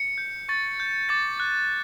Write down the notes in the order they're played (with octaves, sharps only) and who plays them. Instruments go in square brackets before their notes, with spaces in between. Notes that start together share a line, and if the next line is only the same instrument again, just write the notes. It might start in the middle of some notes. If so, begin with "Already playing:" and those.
Already playing: [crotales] C#7
G6
C#6 A6
G6
D6 A6
F#6